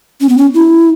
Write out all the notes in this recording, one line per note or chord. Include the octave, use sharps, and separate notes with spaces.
C#4
B3
C#4
E4